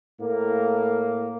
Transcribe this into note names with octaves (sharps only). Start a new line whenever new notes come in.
A2 A#3